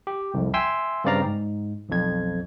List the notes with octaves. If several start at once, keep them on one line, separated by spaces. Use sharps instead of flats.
G4
C2 F2
E5 G5 G#5 C6 E6
G2 C#3 C4 D5 F5 A#5
G#2
B1 F2 G#6